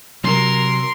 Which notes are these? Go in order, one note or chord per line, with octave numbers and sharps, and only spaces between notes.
C3 F#3 A#4 C6